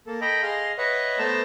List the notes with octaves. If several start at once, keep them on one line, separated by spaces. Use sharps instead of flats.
A#3 A4
A4 D#5 G5 A#5 B5
G#4 D#5 F5 C6
B4 C#5 D#5 E5 F#5
A3 B3 C5 A5 A#5 E6